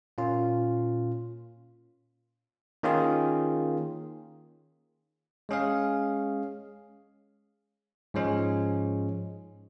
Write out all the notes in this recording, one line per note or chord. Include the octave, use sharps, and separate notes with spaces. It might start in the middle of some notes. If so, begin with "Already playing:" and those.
A#2 A#3 C#4 F4
D#3 A#3 C#4 F4 G#4
G#3 C#4 G#4 F5
G#2 F3 G#3 C#4